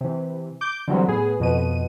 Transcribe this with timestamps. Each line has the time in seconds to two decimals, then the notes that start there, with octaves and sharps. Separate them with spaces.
0.01 C3 E3
0.61 D6 G6
0.88 D3 E3 F#3 G3 C4
1.08 A2 B3 G#4
1.40 F2 B2 D#7